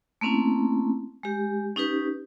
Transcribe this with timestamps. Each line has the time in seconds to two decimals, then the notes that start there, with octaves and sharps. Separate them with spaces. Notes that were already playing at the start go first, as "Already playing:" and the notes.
0.21 A3 A#3 C4 C#4 E4
1.23 G#3 G4
1.76 C#4 D#4 G4 B4